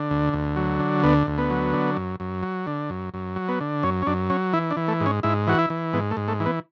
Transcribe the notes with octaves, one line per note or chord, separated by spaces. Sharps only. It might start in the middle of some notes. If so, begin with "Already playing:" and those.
Already playing: D3
D2
D2
F#3
D3
D2 B3
D2
B3
F#3
D3
F#2
F#2
F#3
D3
F#2
F#2
F#3
B3
D3
F#2 C#4
C#4
F#2 D4
F#3 C#4
E3 E4
D4
E3
A3
G#2
C#4
G#2 E4
E3 F#4
E4
E3
G#2 B3
A3
G#2
A3
E3
B3